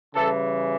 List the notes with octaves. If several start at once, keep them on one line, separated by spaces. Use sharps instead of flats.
C#3 E3 G3 A4